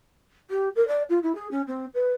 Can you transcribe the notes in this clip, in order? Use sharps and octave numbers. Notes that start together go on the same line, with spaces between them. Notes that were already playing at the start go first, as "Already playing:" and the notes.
G4
A#4
D5
F4
E4
G#4
C#4
C4
B4